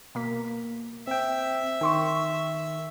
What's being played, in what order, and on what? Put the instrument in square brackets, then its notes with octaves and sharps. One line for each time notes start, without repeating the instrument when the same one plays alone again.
[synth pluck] B2 A#3 B6
[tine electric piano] C4 G5 [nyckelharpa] E5
[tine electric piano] D#3 [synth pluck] G5 C6 C#6